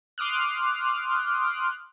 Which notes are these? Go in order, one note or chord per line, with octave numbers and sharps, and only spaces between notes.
C6 D6 D#6 F6 F#6